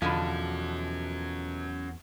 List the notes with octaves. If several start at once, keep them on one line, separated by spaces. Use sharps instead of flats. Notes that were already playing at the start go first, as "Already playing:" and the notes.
E2 B2 D3 F3 C#4 F#4